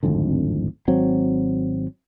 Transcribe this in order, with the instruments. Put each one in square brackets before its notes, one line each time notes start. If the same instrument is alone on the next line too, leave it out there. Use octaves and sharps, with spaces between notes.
[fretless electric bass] D1 G#1 F2 D3
G#1 F#3 C4